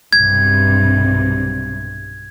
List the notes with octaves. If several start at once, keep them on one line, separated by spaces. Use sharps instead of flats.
B1 G2 C3 G#6